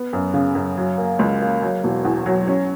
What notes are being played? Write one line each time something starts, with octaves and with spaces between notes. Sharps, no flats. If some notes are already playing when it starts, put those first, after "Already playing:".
Already playing: B3
F#2
C#3
F#2
F#3
A#3
C#2
A#3
F#3
E1
E2
F#3
C#4